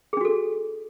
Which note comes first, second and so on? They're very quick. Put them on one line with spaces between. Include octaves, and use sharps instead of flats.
G#4 D4 F#4 A4